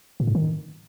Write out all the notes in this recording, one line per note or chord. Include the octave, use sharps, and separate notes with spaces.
A#2
G#2
D#3